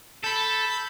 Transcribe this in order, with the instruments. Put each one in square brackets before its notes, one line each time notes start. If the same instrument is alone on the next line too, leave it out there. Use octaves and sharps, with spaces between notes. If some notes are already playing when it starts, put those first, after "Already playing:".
[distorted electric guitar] A4 [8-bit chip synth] B5 G6